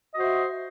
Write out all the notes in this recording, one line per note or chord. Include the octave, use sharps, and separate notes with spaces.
F#4 C5 D#5 E5